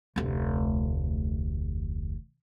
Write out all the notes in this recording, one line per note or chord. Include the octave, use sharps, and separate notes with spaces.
F1 D2